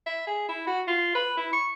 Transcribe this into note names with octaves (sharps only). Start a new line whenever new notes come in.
E5
G#4
E4
F#4
F4
B4
E4
C#6